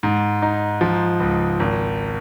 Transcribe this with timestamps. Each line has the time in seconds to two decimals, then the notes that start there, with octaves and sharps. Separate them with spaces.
0.03 G#2
0.42 D#4
0.81 F3
1.20 C#2
1.60 G#1